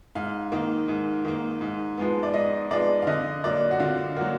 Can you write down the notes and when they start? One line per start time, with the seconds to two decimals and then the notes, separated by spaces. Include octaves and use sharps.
0.15 G#2 F5
0.52 D#3 A#3
0.88 G#2
1.25 D#3 A#3
1.61 G#2
1.97 F3 G#3 B3
2.23 D5
2.34 G#2 D#5
2.70 F3 G#3 B3 D5
3.02 F5
3.07 D3 D#5
3.44 F#3 A#3 D5
3.71 F#4
3.80 D3 F4
4.16 F#3 A#3 F#4